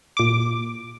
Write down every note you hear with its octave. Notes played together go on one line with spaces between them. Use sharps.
A#2 D6